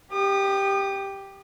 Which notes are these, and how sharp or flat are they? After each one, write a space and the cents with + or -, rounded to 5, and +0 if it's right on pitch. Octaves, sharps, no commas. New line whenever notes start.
G4 +0 D#6 -40